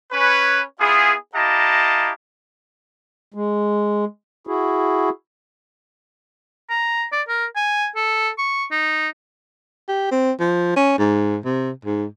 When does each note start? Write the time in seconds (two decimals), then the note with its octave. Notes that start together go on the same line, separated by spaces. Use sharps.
0.13 C#4 B4 C#5
0.80 B3 E4 F4 G#4
1.35 E4 G4 D#5 F5 A5 A#5
3.34 G#3
4.47 E4 F#4 G#4
6.70 A#5
7.12 D5
7.28 A#4
7.56 G#5
7.96 A4
8.38 C#6
8.71 D#4
9.89 G4
10.11 C4
10.40 F3
10.76 C#4
10.99 G#2
11.45 C3
11.85 G#2